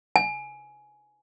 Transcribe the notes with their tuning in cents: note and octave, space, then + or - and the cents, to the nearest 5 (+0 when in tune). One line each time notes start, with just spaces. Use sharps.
G#5 +15